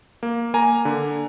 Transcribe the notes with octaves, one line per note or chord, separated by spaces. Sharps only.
A#3
A#3 G#5 A#5
D3